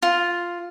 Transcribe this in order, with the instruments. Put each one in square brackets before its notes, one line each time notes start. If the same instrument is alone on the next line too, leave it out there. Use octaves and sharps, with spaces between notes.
[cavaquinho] F4